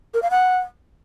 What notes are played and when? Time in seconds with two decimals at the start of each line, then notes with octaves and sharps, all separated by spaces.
0.14 A#4
0.22 F5
0.31 F#5